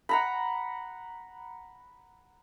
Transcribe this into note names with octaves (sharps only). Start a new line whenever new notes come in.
F#5 A#5 B5